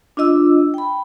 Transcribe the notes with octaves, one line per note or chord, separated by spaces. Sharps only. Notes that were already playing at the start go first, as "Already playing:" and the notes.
D4 F4 D#5 E6
G5 B5